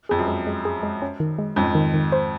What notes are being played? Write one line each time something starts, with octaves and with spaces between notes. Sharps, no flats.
F2 G#4
F#2
G#3
G#3
G#4
G#3
C#4
D#3
G#3
F2 G#2 C#4
D#3
D#3
C5